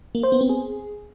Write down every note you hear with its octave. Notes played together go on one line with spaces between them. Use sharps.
A#3
C5
B3
C4
G#4